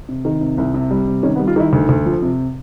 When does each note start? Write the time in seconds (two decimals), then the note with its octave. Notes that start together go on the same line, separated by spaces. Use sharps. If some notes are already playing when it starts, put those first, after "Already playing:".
0.09 C3
0.25 D#3
0.41 C3
0.58 C2
0.74 C3
0.91 G3
1.07 C3
1.23 D#3 C#4
1.35 B3
1.39 G3
1.48 F4
1.56 D#3 E4
1.73 D2
1.89 D2
2.06 F3
2.22 C3